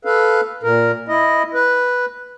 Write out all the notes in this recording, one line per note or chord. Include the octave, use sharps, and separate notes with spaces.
A4 B4 F5
A#2 A#4
E4 D#5
B4